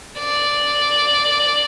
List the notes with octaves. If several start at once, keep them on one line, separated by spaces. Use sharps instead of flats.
D5